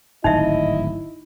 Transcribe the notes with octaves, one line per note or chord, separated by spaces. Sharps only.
D1 G#1 D#4 E4 D#5 E5